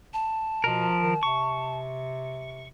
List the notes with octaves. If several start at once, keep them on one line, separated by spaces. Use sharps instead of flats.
A5
B2 F3 A#4
D#3
C3 C#6